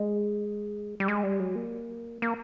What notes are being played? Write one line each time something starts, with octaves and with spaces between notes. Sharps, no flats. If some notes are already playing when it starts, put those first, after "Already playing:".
Already playing: G#3
G3
G#3
G3
F#3
A#3
A#3